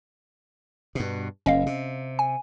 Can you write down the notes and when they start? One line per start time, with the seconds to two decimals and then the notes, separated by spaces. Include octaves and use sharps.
0.95 G2 B2
1.46 F#1 C#4 D#5 F5
1.66 C3
2.19 G#5